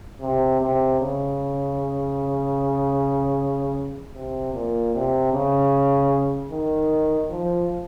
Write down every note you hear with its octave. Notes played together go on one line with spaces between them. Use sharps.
C3
C3
C#3
C3
A#2
C3
C#3
D#3
F3